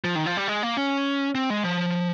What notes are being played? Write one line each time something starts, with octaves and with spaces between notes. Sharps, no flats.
F3
D#3
F3
G3
G#3
A#3
C#4
C4
G#3
F3